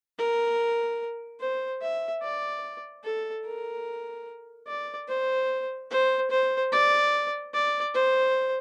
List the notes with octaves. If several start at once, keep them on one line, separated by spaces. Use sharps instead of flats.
A#4
C5
E5
D5
A4
A#4
D5
C5
C5
C5
D5
D5
C5